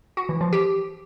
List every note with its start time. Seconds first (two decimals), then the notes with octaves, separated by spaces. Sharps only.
0.17 F#4
0.29 E3
0.41 F3
0.53 G4